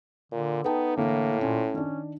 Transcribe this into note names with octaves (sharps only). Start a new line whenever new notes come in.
A#2 D3
B3 D#4 A4 G5 A5
A2 D3 E3 A#3
A#2 C#4
D#3 C#4 D4